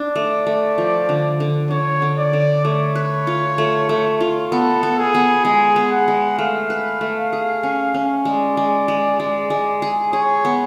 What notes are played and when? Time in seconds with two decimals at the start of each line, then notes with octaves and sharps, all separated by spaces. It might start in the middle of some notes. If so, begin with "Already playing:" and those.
Already playing: D4 D5
0.16 A3
0.47 A3
0.78 F3
1.09 D3
1.40 D3
1.70 D3 C#5
2.02 D3
2.18 D5
2.33 D3
2.65 A3 C#5
2.95 B4
3.27 F4
3.58 A3
3.89 A3
4.20 F4
4.52 B3 A4
4.83 B3
4.99 G#4
5.15 B3
5.45 G#3 G#4
5.76 B3
5.92 F#5
6.08 G#3
6.38 A3 F5
6.70 B4
7.01 A3
7.33 G#4
7.63 C#4
7.94 C#4
8.25 G#3 D5
8.57 G#3
8.88 G#3
9.20 G#3
9.50 G#3
9.82 G#4
10.13 G#4 C#5
10.45 B3